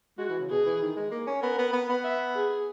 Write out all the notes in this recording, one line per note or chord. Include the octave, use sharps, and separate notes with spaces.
G#3 F#4
E3
C#3
B2 G#4
E3
D#3
G#3
A#3
C#4
B3 A#4
B3
B3
B3
E5
G#4